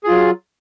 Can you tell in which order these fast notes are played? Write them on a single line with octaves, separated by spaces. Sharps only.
G#4 F4 F#3